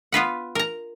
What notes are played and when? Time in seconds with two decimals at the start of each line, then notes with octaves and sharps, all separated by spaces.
0.12 B3 F4 B4 F#5
0.55 A#4 A#5